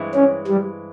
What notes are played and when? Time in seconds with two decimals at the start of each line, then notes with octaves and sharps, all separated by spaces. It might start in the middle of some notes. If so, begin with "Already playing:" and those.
Already playing: G2 E3 G#3 C4 E4
0.15 C#4
0.47 G3